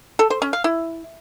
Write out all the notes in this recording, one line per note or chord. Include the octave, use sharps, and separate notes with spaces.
A4
C5
C#4
F5
E4